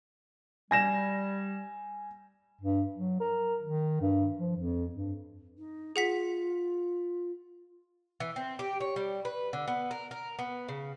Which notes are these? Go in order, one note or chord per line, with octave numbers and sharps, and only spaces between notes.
G3 G#5 A#6 E7
G2
F#3
A#4
D#3
G2
F3
F2
G2
D#4
F4 G#4 F#5 B6
E3
C4
G4
C#5
G3
B4
D3
B3
A#4
A#4
B3
C#3